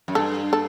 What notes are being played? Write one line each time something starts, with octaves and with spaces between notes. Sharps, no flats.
F#2
G2 A4
A4